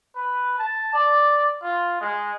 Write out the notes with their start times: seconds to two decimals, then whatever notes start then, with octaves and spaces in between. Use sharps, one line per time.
0.16 B4
0.58 A5
0.93 D5
1.63 F4
2.01 G#3